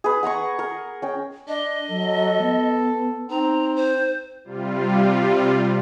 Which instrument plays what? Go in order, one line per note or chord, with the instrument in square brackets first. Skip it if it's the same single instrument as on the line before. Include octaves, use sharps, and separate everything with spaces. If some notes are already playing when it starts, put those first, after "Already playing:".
[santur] G#4 B4
F#5 G#5 A#5 C#6
A#4
C#4 G5
[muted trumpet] D4 [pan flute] D#5
[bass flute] F#3 [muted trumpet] A4
[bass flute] B3
[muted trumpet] C4 [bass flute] D#4 [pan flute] A#5
[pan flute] C5
[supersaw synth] C3 G3 F4